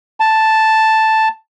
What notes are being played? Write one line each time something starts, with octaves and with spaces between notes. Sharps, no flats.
A5